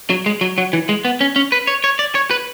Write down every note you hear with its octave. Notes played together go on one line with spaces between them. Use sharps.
F#3
G#3
F#3
F#3
E3
G#3
B3
C#4
C#4
B4
C#5
C#5
D5
C#5
B4